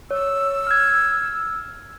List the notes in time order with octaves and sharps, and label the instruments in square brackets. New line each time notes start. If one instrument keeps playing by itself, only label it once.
[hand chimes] C#5 [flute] E6
[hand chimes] F6 G6 G#6